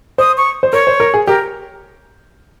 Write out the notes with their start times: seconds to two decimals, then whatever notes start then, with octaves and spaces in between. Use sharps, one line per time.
0.18 C5 D#6
0.37 C#6
0.63 C5
0.73 A#4 C#5
0.87 C5
1.00 A#4
1.14 G#4
1.27 G4 A#4